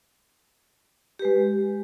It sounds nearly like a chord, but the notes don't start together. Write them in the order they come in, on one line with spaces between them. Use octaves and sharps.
G4 B4 G#3